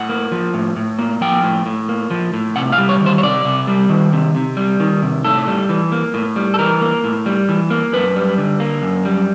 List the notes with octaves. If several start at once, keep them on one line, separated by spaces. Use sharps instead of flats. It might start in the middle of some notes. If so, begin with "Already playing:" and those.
Already playing: A2 F#5
A#3
F3
A2
A2
A#3
F3 G5
A2
A2
A#3
F3
A2
C3 F#5
F5
G3
C#5
D#3
C5
C#5
C3 D5
C3
G3
D#3
C3
C3
G3
D#3
C3
A2 A4
G3
E3
A#3
A2
G3
A4
E3 A#4
A#3
A2
G3
E3
A#3
F#2 B4
G3
D3
A#3
F#2
G3